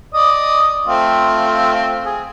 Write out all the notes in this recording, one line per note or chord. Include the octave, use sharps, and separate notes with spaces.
D5 D#5 D#6
A3 C4 F4
G#4